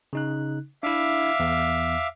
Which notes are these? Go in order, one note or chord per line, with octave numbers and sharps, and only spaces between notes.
C#3 D#4 F#6
D4 E4 E5 F5 D6
E2